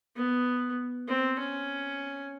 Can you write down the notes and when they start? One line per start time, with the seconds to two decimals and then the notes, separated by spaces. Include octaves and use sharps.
0.16 B3
1.08 C4
1.39 C#4